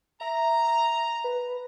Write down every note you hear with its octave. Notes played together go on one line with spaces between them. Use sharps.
E5 A#5
B4